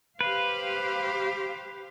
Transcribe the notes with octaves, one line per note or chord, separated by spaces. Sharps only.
G4 B4 C5 F5